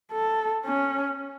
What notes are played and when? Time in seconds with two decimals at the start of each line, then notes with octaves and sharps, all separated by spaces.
0.12 A4
0.65 C#4